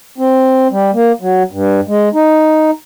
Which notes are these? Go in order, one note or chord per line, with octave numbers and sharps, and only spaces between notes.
C4
G3
A#3
F#3
G2
G#3
D#4